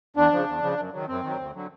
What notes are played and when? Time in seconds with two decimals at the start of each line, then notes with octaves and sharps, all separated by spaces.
0.16 E2 D4
0.32 C#3 F3
0.47 E2
0.62 C#3 F3
0.78 F#2
0.93 D#3 F#3
1.08 F#2 C4
1.24 D#3 F#3
1.39 D2
1.54 D3 F#3